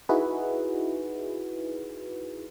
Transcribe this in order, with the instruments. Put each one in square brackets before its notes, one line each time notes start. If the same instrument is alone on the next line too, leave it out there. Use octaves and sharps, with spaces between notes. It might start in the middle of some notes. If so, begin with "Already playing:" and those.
[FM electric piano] D#4 E4 F#4 G#4 B4